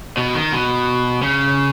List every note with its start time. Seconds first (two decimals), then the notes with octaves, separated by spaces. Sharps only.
0.17 B2
0.35 D#3
0.52 B2
1.22 C#3